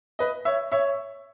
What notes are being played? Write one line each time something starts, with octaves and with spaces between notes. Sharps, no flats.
B4 D#5
C#5 E5
C#5 E5